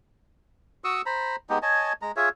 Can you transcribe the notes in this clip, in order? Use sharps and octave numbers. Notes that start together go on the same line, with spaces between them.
F#4 C#6 D#6 E6
C5 A#5 B5
G#3 B3 D#4 G4
C#5 D#5 G#5 A5
G#3 A#5
F4 G#4 C#5 E5